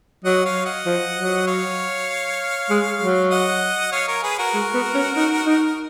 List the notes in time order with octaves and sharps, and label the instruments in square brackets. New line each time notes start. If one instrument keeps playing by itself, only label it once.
[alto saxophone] F#3 [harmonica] D#5 F#5
[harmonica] C#5 F5
D#5 F#5
[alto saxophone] F3
F#3
[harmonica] C#5 F5
[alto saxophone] G#3
F#3
[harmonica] D#5 F#5
C#5 F5
A#4 C#5
G#4 B4
F#4 A#4
[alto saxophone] G#3
B3
C#4
D#4
D#4